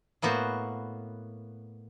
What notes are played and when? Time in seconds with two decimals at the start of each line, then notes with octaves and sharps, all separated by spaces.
0.22 A2 A#3 B3 F#4 C5